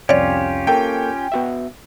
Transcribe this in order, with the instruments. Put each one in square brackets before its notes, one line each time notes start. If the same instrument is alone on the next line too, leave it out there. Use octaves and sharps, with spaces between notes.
[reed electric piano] C2 F2 [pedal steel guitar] C#4 F4 G4 [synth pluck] C#5 D5
[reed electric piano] A#3 A4 A#4 [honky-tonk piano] G5
[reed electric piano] B3 F#4 E5